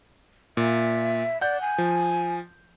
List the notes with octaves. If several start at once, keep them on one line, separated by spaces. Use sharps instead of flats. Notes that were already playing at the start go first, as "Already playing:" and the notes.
A#2 E5
D5 F#5 G6
G#5
F3